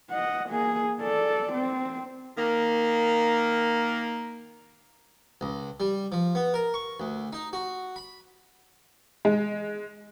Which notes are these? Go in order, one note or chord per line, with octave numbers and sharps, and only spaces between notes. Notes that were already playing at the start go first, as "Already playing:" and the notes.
D#5 F#5
A#3 G#4
A4 D5
C4
D#3 A#3
C#2
G3
F3
B3
A#4
C#6
D2
D#4
F#4
B5
G#3